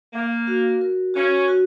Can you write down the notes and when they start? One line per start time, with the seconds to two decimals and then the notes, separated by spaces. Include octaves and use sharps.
0.13 A#3 A#4
0.47 F#4
0.81 A#4
1.14 C#4 F#4
1.48 F#4